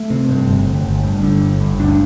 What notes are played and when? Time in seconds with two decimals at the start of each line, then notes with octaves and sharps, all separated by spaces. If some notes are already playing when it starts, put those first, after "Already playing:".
Already playing: A3
0.10 C3
0.29 G2
0.48 G1
0.66 G1
0.86 G1
1.04 G2
1.23 D3
1.41 G1
1.60 G2
1.79 D2 D4